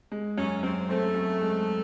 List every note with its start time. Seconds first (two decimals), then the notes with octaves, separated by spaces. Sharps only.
0.12 G#3
0.37 F#2 C#4
0.63 F#2 C4
0.89 A3 C4
1.14 F#2
1.41 G#3